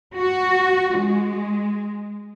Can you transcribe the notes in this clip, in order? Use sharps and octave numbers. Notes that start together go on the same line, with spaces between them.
F#4
G#3